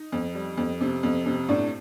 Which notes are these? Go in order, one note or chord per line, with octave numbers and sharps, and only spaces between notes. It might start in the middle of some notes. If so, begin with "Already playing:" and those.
Already playing: D#4
F2
G3
F2
C3
F2
C3
A2 D4